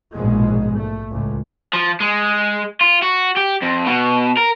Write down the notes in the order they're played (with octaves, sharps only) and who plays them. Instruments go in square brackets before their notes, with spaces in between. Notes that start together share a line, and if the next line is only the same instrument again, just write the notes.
[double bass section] A#1 G#2 B2 G#3
A3
C#2 A2
[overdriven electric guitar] F3
G#3
F4
F#4
G4
F2
B2
A#4